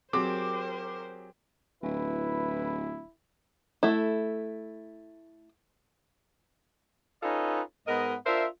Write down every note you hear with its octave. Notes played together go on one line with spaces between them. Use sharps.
F#3 C4 G4 G#4 A#4 C5 D6
D1 E4 B4
A3 E4
C#4 D#4 F4 A4 B4 D#5
G#2 B3 A#4 D#5
D4 F4 A#4 C5 E5